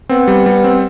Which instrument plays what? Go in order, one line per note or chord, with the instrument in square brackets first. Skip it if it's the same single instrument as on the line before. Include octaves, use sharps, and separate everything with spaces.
[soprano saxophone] B3 [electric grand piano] C4
[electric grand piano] G3
G3
C4